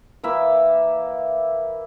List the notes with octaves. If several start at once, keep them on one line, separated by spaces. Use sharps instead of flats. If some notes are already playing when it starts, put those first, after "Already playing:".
E3 A#3 E5 B5